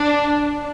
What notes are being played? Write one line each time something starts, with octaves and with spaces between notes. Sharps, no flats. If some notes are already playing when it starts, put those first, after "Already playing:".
Already playing: D4